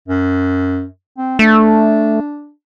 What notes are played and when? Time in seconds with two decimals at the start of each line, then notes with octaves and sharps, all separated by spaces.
0.08 F#2
1.18 C4
1.39 A3 D4